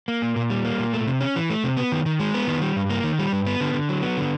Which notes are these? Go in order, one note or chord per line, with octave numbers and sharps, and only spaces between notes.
A#3
A#2
A#2
G3
A#3
A#2
A3
C3
C#4
E3
A3
C3
B3
D#3
D#3
G#3
B3
D#3
G3
G2
A#3
D#3
G3
G2
B3
D3
D3
F#3
B3
D3